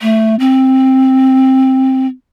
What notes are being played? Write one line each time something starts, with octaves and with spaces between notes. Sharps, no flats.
A3
C4